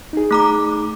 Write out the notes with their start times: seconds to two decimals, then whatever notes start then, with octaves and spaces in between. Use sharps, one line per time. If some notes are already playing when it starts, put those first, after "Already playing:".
0.13 D#4 G#4
0.31 A3 A#5 D6